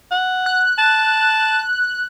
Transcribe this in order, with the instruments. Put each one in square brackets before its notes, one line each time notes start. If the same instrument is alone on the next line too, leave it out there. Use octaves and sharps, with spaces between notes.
[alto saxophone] F#5
[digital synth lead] F#6
[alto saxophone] A5